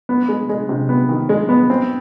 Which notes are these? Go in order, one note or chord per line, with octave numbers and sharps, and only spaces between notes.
B3
G#3
G#3
C3
B3
D#3
G#3
B3
C4